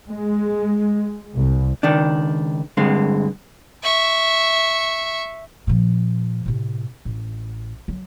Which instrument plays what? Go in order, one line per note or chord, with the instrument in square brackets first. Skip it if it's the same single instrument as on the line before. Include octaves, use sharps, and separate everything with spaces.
[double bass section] G#3
C2
[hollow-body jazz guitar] C#2 D#3 D4
G2 D3 G#3 C4
[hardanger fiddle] E5 C#6
[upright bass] A#2 F3
A2 C3
A1
F#3